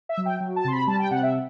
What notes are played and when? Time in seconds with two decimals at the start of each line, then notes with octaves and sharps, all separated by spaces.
0.09 E5
0.17 F#3
0.26 G5
0.40 F#3
0.56 A5
0.64 C3 C6
0.72 B5
0.87 G3 A5
1.00 G5
1.11 C3 F#5
1.23 E5